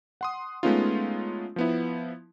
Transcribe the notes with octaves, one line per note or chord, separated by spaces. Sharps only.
F#5 C6 D#6
G#3 A3 B3 C#4 D#4 F4
F3 B3 E4